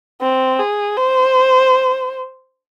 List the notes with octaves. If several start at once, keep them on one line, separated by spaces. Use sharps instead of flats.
C4
G#4
C5